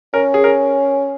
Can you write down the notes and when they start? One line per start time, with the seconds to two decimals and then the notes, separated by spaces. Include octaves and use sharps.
0.14 C#4 A#4
0.34 G#4
0.44 A#4